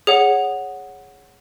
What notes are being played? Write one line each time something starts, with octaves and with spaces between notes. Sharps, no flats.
G#4 C#5 F#5